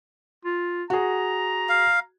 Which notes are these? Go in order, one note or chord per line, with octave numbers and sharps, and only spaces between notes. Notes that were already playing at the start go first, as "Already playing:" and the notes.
F4
F#4 G#4 A#5
F5